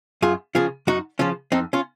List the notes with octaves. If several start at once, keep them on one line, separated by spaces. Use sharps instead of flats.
F#2 F4 G#4
C#3 F3 F4 G#4
F#2 D#4 F#4
C#3 F3 C#4 F4
F2 C4 D#4
C#4 F4